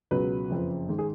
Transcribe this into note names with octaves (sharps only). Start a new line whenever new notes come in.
C#2 B2 F#3 B4
F#1 F2 F3
G#2 D#3
G#4